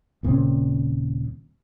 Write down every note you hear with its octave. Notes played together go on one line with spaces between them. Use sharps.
D#1 A#2 C#3 C4